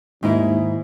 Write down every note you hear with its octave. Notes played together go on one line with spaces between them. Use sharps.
D#2 G#2 D#4 E4